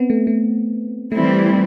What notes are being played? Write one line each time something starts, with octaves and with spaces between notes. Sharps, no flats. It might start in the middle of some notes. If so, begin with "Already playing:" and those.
Already playing: B3 C4
A3
A3
E3 G3 A3 C4 E4